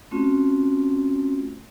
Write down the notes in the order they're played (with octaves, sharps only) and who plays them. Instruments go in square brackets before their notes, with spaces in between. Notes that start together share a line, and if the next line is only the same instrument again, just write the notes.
[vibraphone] A3 C4 C#4 F4 F#4